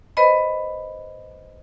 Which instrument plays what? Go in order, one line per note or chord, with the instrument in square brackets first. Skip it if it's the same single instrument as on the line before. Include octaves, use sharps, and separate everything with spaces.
[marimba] B4 C5 D#5 B5